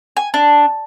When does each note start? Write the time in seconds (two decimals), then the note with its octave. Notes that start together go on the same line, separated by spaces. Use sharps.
0.17 G#5
0.34 D4